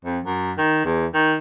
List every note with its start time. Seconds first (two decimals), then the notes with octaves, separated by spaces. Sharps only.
0.05 F2
0.25 F#2
0.58 D#3
0.85 E2
1.14 D#3